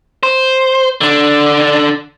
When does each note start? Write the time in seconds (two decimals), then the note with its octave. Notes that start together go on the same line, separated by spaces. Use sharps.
0.23 C5
1.01 D3 D4